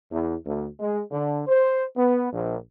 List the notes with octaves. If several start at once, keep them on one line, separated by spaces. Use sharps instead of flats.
E2
D2
G#3
D3
C5
B3
A#1